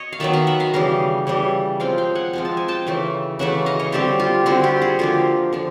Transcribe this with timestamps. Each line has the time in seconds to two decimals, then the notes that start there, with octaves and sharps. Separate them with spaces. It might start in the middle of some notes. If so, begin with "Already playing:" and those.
Already playing: C#5 D#5
0.13 F5
0.20 D#3 F#3 B3 D5 E5
0.33 D#5 F5
0.47 E5 F#5
0.60 D#5 F5
0.73 C#3 E3 G3 D#5 F5
1.27 C#3 E3 G3
1.80 F3 G#3 C4 F5 G5
1.98 F5 G5
2.15 F#5 G#5
2.33 F3 G#3 C4
2.45 A5
2.57 G#5
2.68 G5 A5
2.87 C#3 E3 A3
3.39 C#3 E3 A3 E5 F#5
3.66 D#5 F5
3.79 C#5 D#5
3.92 D3 G3 C4 G4 A4
4.20 F4 G4
4.46 D3 G3 C4 E4 F#4
4.63 F4 G4
4.82 F#4 G#4
4.99 D3 F3 A#3 F4 G4
5.53 D3 F3